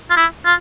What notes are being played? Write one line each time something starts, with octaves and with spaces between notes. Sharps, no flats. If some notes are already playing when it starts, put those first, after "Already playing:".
F4
E4
F4